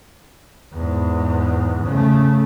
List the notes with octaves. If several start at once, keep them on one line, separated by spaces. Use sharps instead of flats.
E2 G#2
C#3 A3